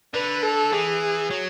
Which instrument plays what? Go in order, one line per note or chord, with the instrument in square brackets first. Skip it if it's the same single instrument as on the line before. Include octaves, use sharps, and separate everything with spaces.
[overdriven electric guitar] D3 [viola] B4
[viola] A4
[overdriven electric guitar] E3 [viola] G#4
[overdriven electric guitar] F#3